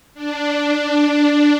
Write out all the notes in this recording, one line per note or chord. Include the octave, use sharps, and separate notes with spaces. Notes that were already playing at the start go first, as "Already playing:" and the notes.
D4